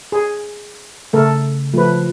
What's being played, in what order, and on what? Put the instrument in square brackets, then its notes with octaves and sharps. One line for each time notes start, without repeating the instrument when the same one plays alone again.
[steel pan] G#4
[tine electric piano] C#3 [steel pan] A3 A4 A#4
[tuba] F3 [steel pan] A3 B4